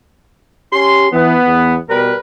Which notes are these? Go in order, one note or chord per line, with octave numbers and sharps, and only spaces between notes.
C#4 G4 C6
E3 B3
E2
B2 G3 A#4 B4